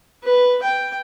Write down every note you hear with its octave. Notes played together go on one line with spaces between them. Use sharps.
B4
G5